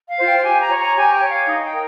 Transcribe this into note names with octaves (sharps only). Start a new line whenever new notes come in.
F5
F4 C5
G5
G4 G#5
A#5
C#5
A#5
G4 G#5
G5
C#5
F5
D#4 D#5
G5
A#4